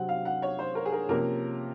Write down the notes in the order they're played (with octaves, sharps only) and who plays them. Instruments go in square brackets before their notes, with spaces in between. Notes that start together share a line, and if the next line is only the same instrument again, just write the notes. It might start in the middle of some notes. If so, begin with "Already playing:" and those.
Already playing: [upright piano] C3 F#3 C4 F#5
F5
F#5
C#5
C5
A#4
G#4
A#4
C3 F3 A#3 C#4 A#4